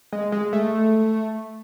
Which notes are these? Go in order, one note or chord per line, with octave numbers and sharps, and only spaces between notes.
G#3
G#3
A3